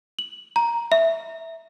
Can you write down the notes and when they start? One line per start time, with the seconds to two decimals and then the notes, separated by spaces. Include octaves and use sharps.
0.19 F#7
0.56 A#5
0.92 E5